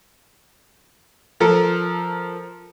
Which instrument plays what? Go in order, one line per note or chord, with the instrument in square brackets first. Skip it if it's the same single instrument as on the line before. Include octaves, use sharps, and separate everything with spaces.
[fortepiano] F3 A4 A#4